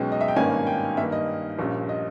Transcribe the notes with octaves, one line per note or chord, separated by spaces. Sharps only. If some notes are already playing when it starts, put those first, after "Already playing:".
Already playing: B1 B2 G#3 C#4 G5
D#5
E5
G5
G#1 G2 D#3 A#3 C#4 G#5
G5
G2 D#3 A#3 E5
D#5
A#1 A#2 G3 C#4
D#5